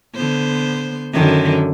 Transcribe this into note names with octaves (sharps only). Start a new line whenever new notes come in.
D3 B3 C5
F#2 D3 D#3